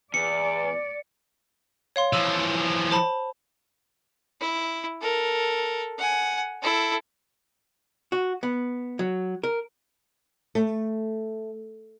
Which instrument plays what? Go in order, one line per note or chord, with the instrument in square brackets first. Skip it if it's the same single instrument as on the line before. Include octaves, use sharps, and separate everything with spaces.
[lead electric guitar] E2 [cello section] D5 [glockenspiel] C#7
[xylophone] C#5 F5 C6
[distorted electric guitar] E3 F3 [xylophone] E6
[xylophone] C5 A5 B5
[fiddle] E4
A4 A#4
F#5 G#5
E4 A4
[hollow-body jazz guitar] F#4
B3
F#3
A#4
[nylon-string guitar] A3